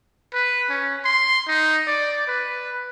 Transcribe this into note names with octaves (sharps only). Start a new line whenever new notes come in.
B4
C#4
C6
D#4
D5
B4